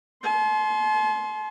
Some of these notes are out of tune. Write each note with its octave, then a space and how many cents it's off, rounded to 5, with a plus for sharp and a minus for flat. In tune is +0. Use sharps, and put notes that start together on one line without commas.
A5 -45 C6 +0